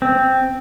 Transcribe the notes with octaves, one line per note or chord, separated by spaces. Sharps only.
C4